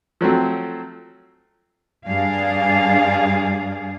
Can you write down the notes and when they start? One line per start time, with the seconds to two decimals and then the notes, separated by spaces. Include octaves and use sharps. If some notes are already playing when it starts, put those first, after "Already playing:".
0.21 F3 F#3 A3 C4
2.06 G2 D4 G#4 F5